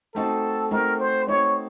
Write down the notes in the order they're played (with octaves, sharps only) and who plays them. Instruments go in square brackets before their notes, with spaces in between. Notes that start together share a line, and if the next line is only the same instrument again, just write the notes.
[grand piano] A3 C4 D#4 F#4 [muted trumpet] A4
[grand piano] A3 C4 D#4 F#4 [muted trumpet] A#4
[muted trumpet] C5
[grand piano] A3 C4 D#4 F#4 [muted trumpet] C#5